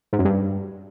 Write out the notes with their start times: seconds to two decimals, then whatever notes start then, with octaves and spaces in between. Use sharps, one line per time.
0.13 G#2
0.19 F#2
0.25 G2